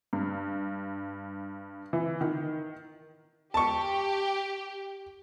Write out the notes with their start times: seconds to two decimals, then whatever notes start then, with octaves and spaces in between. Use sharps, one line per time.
0.13 G2
1.93 E3
2.21 D#3
3.54 G4 A5 C#6